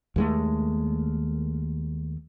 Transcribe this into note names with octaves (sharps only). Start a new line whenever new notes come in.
D#2 G#3 A3